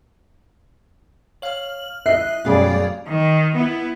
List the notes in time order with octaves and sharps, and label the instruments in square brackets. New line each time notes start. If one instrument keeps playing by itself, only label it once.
[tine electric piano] C#5 F5 [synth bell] F6 F#7
[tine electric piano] E4 C7 [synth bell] D#5 F#6 [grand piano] E5
[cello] F#2 D5 [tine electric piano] B2 A3 C#4 [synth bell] G3 G#4 F5
[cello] D#3
B3 E4